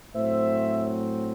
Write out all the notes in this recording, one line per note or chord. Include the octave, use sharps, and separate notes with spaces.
A2 F#3 C4 C5 E5